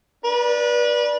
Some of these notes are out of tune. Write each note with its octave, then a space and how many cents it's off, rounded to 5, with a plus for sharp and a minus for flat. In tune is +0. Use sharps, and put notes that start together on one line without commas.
D4 +0 B4 -30